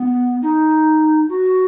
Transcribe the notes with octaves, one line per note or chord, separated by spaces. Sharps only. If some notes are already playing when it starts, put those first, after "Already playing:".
Already playing: B3
D#4
F#4